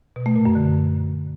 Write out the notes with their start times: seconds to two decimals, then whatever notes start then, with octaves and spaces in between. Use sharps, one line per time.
0.16 B2
0.26 A3
0.36 A#2
0.45 F#2
0.55 D3